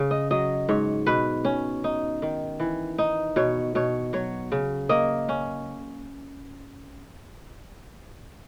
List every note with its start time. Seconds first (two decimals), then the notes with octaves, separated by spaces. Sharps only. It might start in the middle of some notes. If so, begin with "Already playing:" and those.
Already playing: C#3
0.11 D#5
0.31 F#3 D#5
0.69 G#2 C#5
1.06 B2 B4
1.45 C#4
1.84 D#4
2.22 D#3
2.60 E3
2.98 D#4
3.36 B2 C#5
3.75 B2 C#5
4.13 F#3 C#5
4.52 C#3
4.89 A#3 D#5
5.29 C#4